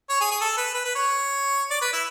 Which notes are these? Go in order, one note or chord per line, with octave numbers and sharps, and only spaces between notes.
C#5
G#4
G#4
A4
B4
B4
B4
C#5
D5
B4
E4